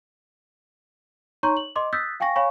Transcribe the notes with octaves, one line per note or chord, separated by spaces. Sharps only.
D#4 C#5 A#5 C6 C#6 G6
F#7
D#5 C6 D6
D#6 E6 F#6 G6 A6 B6
F5 G5 G#5 C#6 A#6
C#5 F5 G#5 B5 C#6